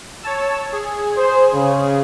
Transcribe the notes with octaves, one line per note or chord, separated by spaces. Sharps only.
C#5 A5 E6
G#4
C5
C#3